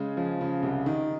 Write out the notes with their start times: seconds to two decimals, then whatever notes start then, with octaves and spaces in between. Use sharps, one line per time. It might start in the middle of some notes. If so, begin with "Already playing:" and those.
Already playing: C#3 G#3
0.17 F3
0.41 C#3
0.63 C2
0.86 D#3